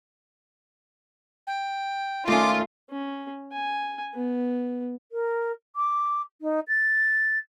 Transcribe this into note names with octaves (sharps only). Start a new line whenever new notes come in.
G5
D#3 A3 C#4 F4 D6
C#4
G#5
B3
A#4
D6
D#4
A6